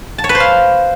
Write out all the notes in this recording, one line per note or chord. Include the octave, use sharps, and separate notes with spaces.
A5
C#5
B4
C5
F5